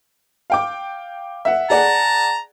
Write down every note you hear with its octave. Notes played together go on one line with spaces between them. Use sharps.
F5 G5 D6
E5 F#5
G#4 D5 F#5 A5 A#5